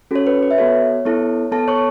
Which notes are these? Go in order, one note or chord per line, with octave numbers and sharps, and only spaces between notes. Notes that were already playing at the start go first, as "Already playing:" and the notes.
C#4 F#4 A4 C#5
B4
B4
E5
B3 F#4 A4 C#5
B3 E4 A4
B3 A4 A5
C#5 C#6